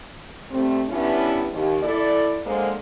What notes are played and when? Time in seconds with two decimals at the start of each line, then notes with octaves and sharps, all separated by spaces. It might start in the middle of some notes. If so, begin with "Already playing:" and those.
0.51 G3 A3 C4
0.89 G3 B3 C#4 D4 E4
1.53 D#2
1.83 E4 A4 D5
2.46 D3 G#3 A#3 C5 D5